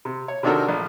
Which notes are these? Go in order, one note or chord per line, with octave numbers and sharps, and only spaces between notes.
C3
C#5
C3 D#3 D4 F#4 A4 A#4
A#1